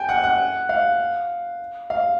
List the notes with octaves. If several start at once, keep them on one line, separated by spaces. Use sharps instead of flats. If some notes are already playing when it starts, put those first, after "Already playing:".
Already playing: G5 G#5
F#5
F#5
F5
F5